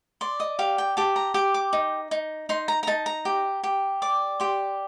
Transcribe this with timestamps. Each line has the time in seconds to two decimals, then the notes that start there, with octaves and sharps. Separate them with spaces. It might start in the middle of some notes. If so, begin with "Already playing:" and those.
0.21 D5 C6
0.40 D#5
0.59 G4 F5
0.78 G5
0.97 G4 A5
1.16 A#5
1.34 G4 D6
1.54 D6
1.73 D#4
2.11 D#4
2.49 D#4 C6
2.68 A#5
2.83 A#5
2.87 D#4 A5
3.06 A#5
3.25 G4
3.63 G4
4.02 D5 D6
4.40 G4 C6